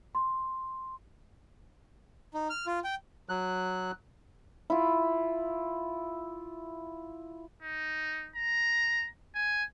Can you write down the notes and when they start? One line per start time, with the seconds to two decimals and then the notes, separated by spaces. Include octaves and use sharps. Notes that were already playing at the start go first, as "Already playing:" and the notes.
0.15 C6
2.34 D#4
2.50 F6
2.67 F4
2.84 G5
3.29 F#3 F#6
4.70 E4 F4
7.62 D#4
8.36 A#5
9.35 G#5